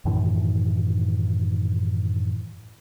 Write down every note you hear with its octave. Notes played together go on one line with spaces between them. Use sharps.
F#2 A2 D#3 E3